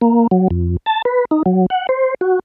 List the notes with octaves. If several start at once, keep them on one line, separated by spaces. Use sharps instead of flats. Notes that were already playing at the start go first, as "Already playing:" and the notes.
A#3
F#3
F2
A5
B4
D#4
F#3
F#5
C5
F#4